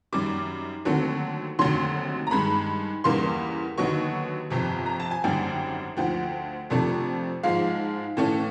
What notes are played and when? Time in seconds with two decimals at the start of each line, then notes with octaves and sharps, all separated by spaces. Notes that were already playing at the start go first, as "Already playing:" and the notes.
0.13 F#2 D#3 G3 D6
0.85 D#2 D3 F#3 A3 C4
1.59 F1 D#2 D3 F#3 C6
2.27 A#5
2.31 G2 D#3 G#3 B5
3.04 E2 C#3 E3 G3 A#3 C6
3.78 D#2 D3 F#3 B3 D#4 C#6
4.50 G1 F2 C3
4.86 A#5
5.00 A5
5.11 G#5
5.24 G#1 F#2 D3 G3 G5
5.97 D2 D3 F3 G5
6.70 F2 C3 F3 A3 D4
7.43 G#2 F3 G#3 F5
8.17 A2 E3 A3 C#4